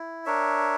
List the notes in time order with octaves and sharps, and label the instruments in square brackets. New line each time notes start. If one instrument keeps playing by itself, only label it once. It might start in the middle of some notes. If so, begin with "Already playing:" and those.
Already playing: [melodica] E4
D4 A#4 C#5 E5